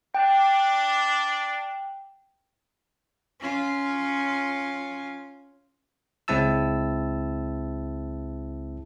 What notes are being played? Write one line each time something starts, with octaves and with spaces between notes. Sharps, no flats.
D4 G5
C#4 F4
C#2 G#3 C4 E4 A5 E6